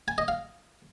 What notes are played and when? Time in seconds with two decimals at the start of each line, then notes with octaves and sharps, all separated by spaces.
0.08 G#5
0.18 D#5
0.28 F5